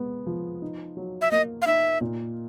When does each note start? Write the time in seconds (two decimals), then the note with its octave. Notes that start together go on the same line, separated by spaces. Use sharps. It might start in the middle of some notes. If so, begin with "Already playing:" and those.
Already playing: G#3 B3
0.26 F3
0.62 D#4
0.97 F#3
1.21 E5
1.31 A#3 D#5
1.62 F5
1.66 D#4 E5
2.01 A#2